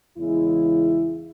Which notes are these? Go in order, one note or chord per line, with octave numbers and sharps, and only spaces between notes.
E2 C#3 G#3 E4